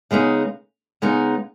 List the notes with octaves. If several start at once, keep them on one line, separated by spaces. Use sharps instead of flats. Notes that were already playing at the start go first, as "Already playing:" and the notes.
C#3 G#3 B3 D#4
C#3 G#3 B3 D#4